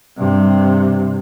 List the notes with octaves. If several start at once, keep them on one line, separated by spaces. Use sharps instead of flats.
G2 C3